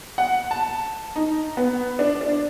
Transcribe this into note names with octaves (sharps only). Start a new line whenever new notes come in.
F#5
A5
D#4
B3
D4
D4